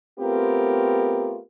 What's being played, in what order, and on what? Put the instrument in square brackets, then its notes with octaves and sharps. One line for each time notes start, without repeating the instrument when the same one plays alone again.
[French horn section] A3 B3 C4 F4 G4 A#4